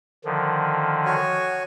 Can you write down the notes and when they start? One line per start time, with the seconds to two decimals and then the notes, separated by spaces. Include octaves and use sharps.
0.25 D3 D#3 F3
1.05 F#4 C#5 G#5